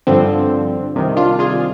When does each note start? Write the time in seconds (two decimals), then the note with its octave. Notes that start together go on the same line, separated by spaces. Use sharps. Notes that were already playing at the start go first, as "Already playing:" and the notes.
0.07 G2 D3 F3 C4
0.96 C2 C3 D#3
1.17 D4 F4
1.39 F4 G#4